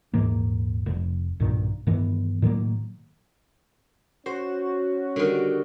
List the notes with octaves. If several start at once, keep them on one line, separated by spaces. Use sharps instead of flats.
D#1 G#2 E3 A#3
F1
B1 G2 A#2 D#3
G2 D#3 E3 B3
A2 D#3 F#3 A#3
C#4 F#4 C5
D3 D#3 G3